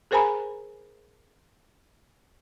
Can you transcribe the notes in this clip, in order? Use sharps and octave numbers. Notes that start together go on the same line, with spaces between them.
G#4 A#4 C5 G#5 A#5 B5